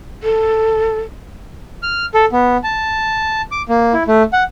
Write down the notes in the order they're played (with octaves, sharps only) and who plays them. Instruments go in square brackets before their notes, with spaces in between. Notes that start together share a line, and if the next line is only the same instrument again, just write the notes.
[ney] A4
[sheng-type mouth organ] F6
A4
B3
A5
D6
A#3
E4
A3
F#5